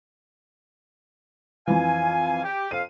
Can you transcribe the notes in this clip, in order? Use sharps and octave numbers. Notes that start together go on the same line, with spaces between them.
F2 E3 F5 G#5
G4
F2 F5 D#7